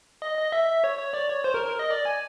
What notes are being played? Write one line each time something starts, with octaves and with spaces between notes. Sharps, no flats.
D#5
D#5
E5
C#5
C#5
D5
C#5
C5
A#4
A#4
D#5
D5
G#5